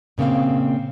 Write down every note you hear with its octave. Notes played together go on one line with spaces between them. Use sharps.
A#2 C#3 A#3 C4 F5